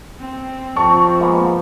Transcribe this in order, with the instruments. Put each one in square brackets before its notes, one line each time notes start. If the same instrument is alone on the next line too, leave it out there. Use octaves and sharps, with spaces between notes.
[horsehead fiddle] C4
[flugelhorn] F3 [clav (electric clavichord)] A5 [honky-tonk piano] C#6
[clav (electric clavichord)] G#3 A#3 B3